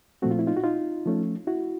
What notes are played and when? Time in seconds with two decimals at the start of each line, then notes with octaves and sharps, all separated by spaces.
0.22 A#2 F3 A3 C4 F#4
0.31 F4
0.39 E4
0.47 D#4 F4
0.57 F#4
0.64 D#4 F4
1.06 F3 A3 C#4
1.47 E4 F#4